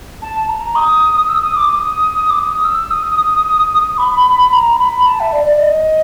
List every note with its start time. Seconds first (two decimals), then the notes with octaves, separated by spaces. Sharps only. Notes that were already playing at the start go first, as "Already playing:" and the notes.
0.22 A5
0.48 A#5
0.75 D#6
1.28 E6
1.41 D#6
1.55 D6
1.68 D#6
2.29 D6
2.36 D#6
2.64 E6
2.90 D#6
3.98 B5
4.52 A#5
4.79 B5
5.06 A5
5.20 E5
5.32 D5
5.46 D5
5.59 D#5